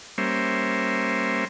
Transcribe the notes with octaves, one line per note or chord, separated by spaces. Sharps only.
G3 A#3 C#4 C5 E5